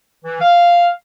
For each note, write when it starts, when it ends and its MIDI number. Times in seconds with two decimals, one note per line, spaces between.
0.25 0.40 52
0.41 0.89 77